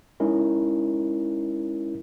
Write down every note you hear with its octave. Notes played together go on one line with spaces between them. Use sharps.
G#3 C#4 D#4 E4 A#4